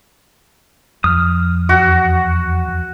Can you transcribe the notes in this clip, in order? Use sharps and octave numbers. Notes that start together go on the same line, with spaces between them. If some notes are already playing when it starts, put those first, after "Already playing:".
F2 D#6 F6
E2 F#4